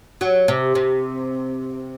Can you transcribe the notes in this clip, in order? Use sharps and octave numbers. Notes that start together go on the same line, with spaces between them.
F#3
C3
C3